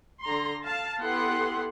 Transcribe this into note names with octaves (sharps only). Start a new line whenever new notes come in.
D3 A#5 C6
F5 A5
B3 E4 G4 A4 F#5 C6